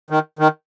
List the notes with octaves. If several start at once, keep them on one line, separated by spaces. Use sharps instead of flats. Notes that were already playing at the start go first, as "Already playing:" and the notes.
D#3
D#3